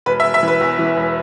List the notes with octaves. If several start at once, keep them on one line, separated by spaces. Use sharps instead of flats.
E1 B4
E5
E1
E5
E3 B4
E2
E3
E1